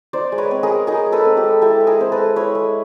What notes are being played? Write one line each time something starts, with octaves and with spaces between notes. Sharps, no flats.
D#4 C5 D5
G#3
B4 C#5
C4
G#4 A#4
G#3
D#4 G#4 A#4
G#3
A4 B4
C4
G4 A4
G#3
E4 G4 A4
G#3
G#4 A#4
C4 C5
A4 B4
G#3
E4 B4 C#5
G#3